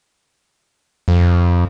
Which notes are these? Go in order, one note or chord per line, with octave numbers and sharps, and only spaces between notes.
F2